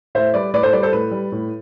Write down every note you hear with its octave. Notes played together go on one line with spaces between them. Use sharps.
A2 C5 E5
G3 B4 D5
A2 B4 D5
A4 C5
G3 B4 D5
A4 C5
A2 B4
G3
A2